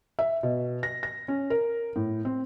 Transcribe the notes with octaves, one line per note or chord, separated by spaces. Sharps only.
E5
B2
A#6
A#6
C#4
A#4
A2
C4